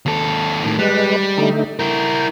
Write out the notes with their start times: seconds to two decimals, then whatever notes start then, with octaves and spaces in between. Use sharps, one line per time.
0.06 D#2 A4
0.64 A2 D#3
0.79 G3 G#3 B4
1.38 D3 A3 D#4
1.79 E4 A#4 G6